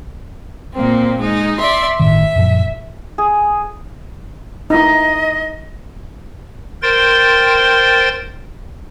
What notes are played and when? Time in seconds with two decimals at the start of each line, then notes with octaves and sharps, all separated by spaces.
0.75 A#2 A#3 C4
1.18 G#3 D#4
1.57 D5 E5 C6
2.00 G1 A2 D#3 E5
2.36 F#2 A#2 F3
3.18 G#4
4.70 D#4 E4 D#5
6.82 A#4 C5 G5 C6 A6